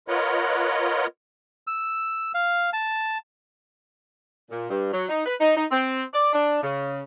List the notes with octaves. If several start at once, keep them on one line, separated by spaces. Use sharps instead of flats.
F4 A#4 B4 C#5 D#5 F#5
E6
F5
A5
A#2
G2
F#3
D#4
B4
D#4
D#4
C4
D5
D4
C#3